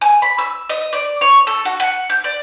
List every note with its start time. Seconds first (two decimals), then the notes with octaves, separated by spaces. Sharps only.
0.01 G#5
0.22 B5
0.39 E6
0.69 D#5
0.93 D5
1.21 C#5
1.47 A4
1.65 F#4
1.80 F#5
2.10 G6
2.24 D5